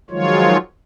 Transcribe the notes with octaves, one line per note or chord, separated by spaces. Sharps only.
D#3 F3 F#3 G#3 F4 C#5